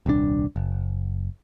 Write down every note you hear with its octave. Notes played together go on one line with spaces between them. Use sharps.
D#1 C2 A#2 D4
F#1